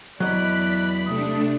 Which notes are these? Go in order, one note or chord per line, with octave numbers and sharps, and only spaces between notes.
E2 F#3 D5 D#5 B5 F#6
C3 A3 D4 D#6